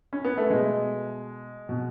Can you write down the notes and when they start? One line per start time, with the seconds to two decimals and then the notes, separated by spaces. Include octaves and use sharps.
0.13 C#4
0.24 B3
0.38 A3
0.50 B2 G#3
1.69 B2